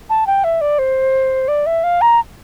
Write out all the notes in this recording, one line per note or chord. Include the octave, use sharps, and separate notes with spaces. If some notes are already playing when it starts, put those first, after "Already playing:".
A5
G5
E5
D5
C5
D5
E5
F5
A#5